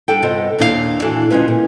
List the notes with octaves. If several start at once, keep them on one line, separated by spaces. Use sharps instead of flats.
G3 D4 A4 G5
G2 C3 B3 F4 A4 D#5
D#2 A#2 D4 E4 G4 F5
A#2 E3 D4 F#4 A4
D2 G#3 C#4 F4 B4
A#2